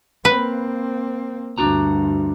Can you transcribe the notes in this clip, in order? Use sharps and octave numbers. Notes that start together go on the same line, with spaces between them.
A#3 C4 B4
D2 G2 D4 F#4 A#5